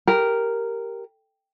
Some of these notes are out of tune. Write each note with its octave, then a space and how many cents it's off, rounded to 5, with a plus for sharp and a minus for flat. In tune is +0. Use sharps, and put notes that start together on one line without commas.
G4 +0 A#4 -5